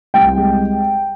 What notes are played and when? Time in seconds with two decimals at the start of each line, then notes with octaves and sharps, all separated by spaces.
0.14 C2 G5
0.37 G#3